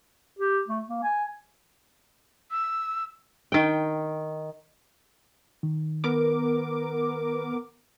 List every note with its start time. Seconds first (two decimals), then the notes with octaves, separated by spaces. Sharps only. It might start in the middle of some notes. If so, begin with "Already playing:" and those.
0.39 G4
0.68 A3
0.89 A#3
1.03 G#5
2.51 E6
3.52 D#3 G5
5.63 D#3
6.04 B3 A#4 D6